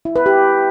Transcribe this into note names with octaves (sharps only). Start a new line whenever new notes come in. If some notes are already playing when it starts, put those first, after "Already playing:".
E4
B4
G4